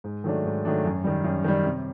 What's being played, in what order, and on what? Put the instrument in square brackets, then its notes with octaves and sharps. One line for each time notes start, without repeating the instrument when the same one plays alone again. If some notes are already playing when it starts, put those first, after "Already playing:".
[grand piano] G#2
D#3 F#3 A3 D4
G#2
D#3 F#3 A3 D4
F#2
D#3 G3
F#2
D#3 G3
C3